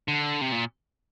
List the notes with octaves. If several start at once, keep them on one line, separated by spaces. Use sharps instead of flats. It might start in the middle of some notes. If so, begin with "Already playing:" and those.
D3
C3
A#2